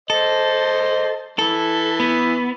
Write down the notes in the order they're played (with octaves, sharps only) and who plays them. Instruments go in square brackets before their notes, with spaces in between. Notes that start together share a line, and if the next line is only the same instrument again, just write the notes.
[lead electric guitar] A4 [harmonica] C5 D#5
[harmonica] E3 [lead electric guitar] A4
[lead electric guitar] B3